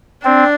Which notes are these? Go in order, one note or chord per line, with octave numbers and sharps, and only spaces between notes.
C4 D4